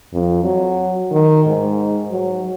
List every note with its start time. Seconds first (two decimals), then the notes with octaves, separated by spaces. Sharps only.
0.13 F2
0.44 F#3
1.11 D#3
1.48 G#2
2.11 F#3